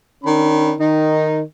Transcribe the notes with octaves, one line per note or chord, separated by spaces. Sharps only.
D#3 C#4 D4 B5
D#3 D#4